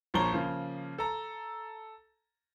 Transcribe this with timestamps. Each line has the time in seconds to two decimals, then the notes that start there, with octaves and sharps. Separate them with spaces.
0.14 A#1 F3 A#4 C#5 A#5 G7
0.33 C#3 F3 A#3
0.98 A4 A#5